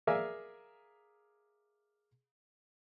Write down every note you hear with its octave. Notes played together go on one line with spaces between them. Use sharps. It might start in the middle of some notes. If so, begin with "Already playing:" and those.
G#4 A#4 D5 E5 F5 G#5